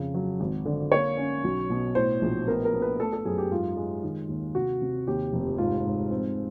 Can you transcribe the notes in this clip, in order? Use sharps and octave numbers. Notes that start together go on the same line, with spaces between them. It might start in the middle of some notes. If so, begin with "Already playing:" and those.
Already playing: F2 C#3
F#3
G#1
D3
A#3 C#5
C#4
B1
B2
A2 C5
A#1
B3 A#4
A#4
B3
B4
A3 A4
A4
F#2 G#4
G4
G#2 F4
G#3
D#3
D#2
C3 F#4
C3
D#2 G4
F1
G#2 F4
G#2
C4